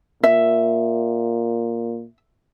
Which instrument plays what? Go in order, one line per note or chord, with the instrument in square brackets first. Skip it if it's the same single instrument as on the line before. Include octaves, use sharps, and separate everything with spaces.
[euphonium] A#2 [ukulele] E5